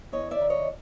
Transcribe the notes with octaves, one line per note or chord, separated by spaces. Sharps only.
E2 C#5 D#5
D5 E5
D#3
C#5 D#5